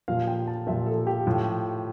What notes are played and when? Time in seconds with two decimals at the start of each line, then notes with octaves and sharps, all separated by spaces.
0.08 A#2 F3 F5
0.27 G5
0.48 A5
0.67 A#2 F3 E5
0.86 A4
1.07 G4
1.27 A2 F3